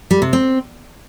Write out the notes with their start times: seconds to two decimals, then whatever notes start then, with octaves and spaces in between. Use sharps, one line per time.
0.11 G3
0.22 C3
0.33 C4